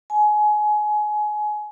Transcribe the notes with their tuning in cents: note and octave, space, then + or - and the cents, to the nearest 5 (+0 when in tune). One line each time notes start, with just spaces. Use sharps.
G#5 +25